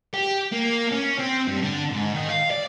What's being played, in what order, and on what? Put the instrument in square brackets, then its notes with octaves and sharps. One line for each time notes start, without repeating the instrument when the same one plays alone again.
[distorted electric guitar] G4
A#3
C#4
C4
G2
D3
G#2
D#3
F5
D5